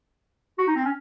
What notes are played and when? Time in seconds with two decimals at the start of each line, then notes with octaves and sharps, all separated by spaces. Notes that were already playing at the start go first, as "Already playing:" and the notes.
0.58 F#4
0.67 D#4
0.76 C4
0.85 C#4